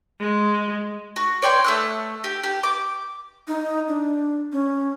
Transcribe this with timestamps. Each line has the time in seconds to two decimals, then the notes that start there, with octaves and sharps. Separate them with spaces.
0.21 G#3
1.16 F#4
1.42 C#5 D5 G5 C6
1.64 A3 E6 F#6
2.24 G4
2.43 G4
2.63 D6
3.48 D#4
3.88 D4
4.52 C#4